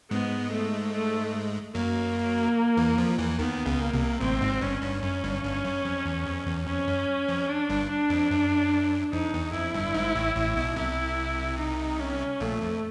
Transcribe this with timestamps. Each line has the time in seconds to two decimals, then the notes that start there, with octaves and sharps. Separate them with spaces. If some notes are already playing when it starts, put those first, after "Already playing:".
0.11 G#2 G#3 B3
0.52 A3
0.93 A3
1.74 F#2 F#3 A#3
2.77 E2 E3
2.98 F2 F3
3.18 E2 E3
3.39 D#2 D#3 B3
3.66 C#2 C#3
3.80 A#3
3.93 C2 C3
4.21 A1 A2 C4
4.41 G#1 G#2
4.61 G1 G2 C#4
4.82 G1 G2
5.02 F#2 C#4
5.24 G1 G2
5.44 G1 G2
5.65 F#2
5.85 F2
6.06 E2
6.26 F2
6.46 E2
6.67 F2 C#4
6.87 F#2
7.28 F2
7.49 D4
7.69 G1 G2
7.90 D4
8.10 F2
8.31 F#2
9.12 F2 D#4
9.34 E2
9.53 F2 E4
9.74 G1 G2
9.94 G#1 G#2
10.15 A1 A2
10.35 A1 A2
10.56 B1 B2
10.76 C2 C3 E4
11.59 D#4
11.99 C#4
12.40 A#1 A#2 A3
12.61 F2